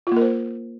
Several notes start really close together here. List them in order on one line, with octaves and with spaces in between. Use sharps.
F4 A#3 A#4 C5